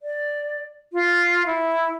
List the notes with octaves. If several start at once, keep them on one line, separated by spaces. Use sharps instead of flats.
D5
F4
E4